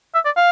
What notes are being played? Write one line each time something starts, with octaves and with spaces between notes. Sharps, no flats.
E5
D5
F5